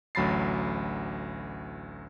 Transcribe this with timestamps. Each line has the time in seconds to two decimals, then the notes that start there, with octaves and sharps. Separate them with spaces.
0.15 A1 D2 F#3 B5 A6 C7